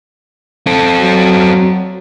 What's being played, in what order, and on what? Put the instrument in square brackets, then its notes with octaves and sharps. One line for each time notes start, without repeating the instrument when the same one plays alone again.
[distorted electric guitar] C4 A4
[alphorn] F#3